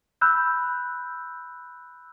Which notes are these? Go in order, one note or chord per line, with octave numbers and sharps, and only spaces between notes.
B5 E6 F#6 G6